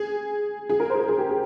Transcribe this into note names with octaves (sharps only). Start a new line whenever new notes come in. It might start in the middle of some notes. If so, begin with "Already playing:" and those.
Already playing: G#4
G#4
A#4
G#4 C5
A#4
G#4
G4
G#4